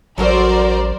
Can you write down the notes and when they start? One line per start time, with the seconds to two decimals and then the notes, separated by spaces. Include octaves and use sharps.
0.18 A1 F#3 F#4 A4 A#4 C5 D5